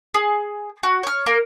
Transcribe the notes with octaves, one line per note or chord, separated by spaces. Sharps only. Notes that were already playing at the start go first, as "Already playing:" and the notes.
G#4
F#4
C#5 F6
A#3 A#4